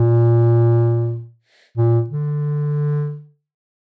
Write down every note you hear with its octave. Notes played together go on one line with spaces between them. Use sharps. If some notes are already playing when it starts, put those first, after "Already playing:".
Already playing: A#2
A#2
D3